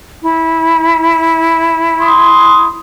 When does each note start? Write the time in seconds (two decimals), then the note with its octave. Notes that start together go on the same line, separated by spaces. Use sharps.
0.23 E4
2.01 C6 D#6